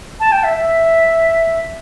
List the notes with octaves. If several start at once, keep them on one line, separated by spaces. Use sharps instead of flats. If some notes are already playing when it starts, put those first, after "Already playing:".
A5
G5
E5
E5